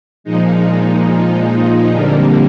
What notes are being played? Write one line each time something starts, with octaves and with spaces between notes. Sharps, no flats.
A#2 F3 G#3 D#4
D#4
D#4
F2 D3 G3 A#3